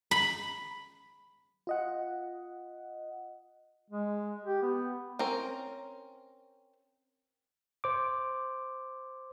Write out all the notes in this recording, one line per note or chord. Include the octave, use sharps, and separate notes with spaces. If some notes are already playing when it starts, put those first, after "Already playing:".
B5
F4 D#5 F#5
G#3
G4
B3
C4 C#4 A#4
C5 D6